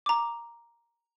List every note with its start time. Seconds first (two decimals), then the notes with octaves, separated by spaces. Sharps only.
0.06 A#5 D6